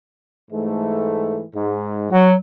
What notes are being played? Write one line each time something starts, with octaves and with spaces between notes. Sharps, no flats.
G#2 E3 A3
G#2
F#3 F#4